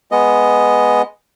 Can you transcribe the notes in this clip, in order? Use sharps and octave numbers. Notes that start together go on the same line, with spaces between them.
G#3 B3 D#5